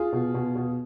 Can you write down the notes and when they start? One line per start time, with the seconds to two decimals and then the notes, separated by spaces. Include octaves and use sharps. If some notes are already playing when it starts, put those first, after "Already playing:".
Already playing: F4 G#4
0.13 B2
0.34 B2
0.55 B2